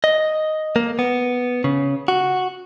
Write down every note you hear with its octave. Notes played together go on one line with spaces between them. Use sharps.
D#5
A#3
B3
C#3
F#4